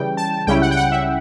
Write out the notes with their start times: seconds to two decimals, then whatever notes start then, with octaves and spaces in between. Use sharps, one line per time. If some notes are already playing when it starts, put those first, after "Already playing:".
Already playing: C#3 E3 G3 G5
0.17 A5
0.47 C#2 C#3 G3 C#4 E4 G5
0.62 F#5
0.71 G5
0.77 F#5
0.92 E5